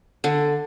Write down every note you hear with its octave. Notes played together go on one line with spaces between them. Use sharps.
D3